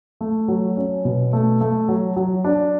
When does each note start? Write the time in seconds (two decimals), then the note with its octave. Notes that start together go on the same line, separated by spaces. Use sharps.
0.21 A3
0.48 F#3
0.77 C#4
1.05 B2
1.33 A3
1.61 A3
1.88 F#3
2.16 F#3
2.44 D4